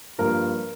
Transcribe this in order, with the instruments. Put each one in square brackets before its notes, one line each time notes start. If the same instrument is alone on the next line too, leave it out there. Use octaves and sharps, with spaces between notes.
[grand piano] G2 F3 A#3 A#4